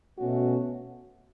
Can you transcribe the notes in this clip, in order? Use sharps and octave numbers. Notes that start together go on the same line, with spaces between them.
B2 A3 C#4 F#4